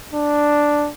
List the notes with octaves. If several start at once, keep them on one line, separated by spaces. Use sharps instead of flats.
D4